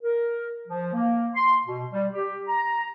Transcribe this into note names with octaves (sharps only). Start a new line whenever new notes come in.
A#4
F3
A#3
C6
B2
G3
G4
A#5